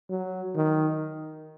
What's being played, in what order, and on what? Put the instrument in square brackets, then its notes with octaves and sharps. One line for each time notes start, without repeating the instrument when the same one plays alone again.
[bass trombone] F#3
D#3